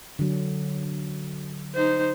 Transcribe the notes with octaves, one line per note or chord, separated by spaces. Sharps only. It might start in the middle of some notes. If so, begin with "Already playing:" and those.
D3 F#3
D#4 C5